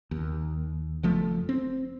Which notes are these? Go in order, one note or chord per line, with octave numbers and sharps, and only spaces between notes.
D#2
F#1 F3 A3
C4